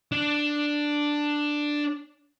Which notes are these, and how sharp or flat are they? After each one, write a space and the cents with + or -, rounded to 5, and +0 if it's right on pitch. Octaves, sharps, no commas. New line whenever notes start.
D4 +5